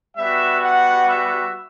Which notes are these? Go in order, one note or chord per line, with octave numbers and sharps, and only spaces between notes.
G3 B3 F#4 E5
F#5
E5